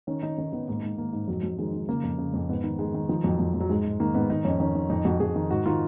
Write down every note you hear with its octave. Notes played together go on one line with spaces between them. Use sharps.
D#3 C#4
D#3 D#4
D#3 C#4
D#3 B3
G#2 A#3
G#2
D#3 A#3
G#2
F2 F#3
F2 F#3
D#3 G#3
D#3
C#3 A#3
F2
C#3
F2
G#2 B3
D#3
D#3 G#3
D#3
D#3 F3
F2 F#3
F2
F2
F#3
G#2 G#3
G#2
D#3 A#3
G#2 B3
D#3 D#4
F2 C#4
D#3 C#4
D#3
F2 D#4
F2 F#4
F2 G#4
D#3
G#2 F#4
D#3 F4